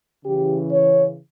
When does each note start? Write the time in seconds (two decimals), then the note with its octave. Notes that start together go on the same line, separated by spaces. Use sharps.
0.25 C#3 E3 G4
0.71 C#5